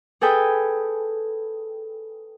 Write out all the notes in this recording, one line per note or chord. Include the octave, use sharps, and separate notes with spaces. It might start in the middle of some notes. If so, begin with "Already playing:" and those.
G#4 A4 B4 G5 D#6